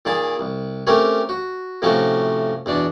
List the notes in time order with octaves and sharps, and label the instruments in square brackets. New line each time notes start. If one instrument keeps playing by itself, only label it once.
[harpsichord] A#2 D#3 G#4 A5
C2
A3 C4 C#4 G4 A#4 C#5
F#4
A2 C3 F3 A3 C#4 F#4
E2 B2 D4